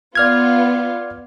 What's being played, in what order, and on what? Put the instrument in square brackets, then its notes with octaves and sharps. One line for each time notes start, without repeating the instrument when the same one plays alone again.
[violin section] B3 F4 [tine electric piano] D5 F6 G#6